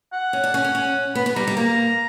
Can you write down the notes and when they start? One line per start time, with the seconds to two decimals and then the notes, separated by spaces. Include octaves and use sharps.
0.13 F#5
0.33 C#4
0.44 D4
0.54 C#4
0.64 C#4
0.75 C#4
1.15 B3 B5
1.26 B3
1.36 G3 A#5
1.47 G3
1.57 A#3 A#5